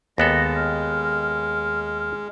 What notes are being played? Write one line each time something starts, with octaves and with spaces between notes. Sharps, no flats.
D#2 G#3 B3 A4 A#6
F6